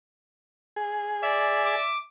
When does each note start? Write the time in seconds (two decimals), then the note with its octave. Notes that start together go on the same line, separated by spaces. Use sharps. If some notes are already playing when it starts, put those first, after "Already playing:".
0.76 G#4
1.23 D5 E5
1.64 D6